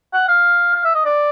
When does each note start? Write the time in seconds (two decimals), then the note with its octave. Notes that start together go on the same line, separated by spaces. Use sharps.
0.13 F#5
0.28 F5
0.74 F5
0.84 E5
0.95 D#5
1.05 D5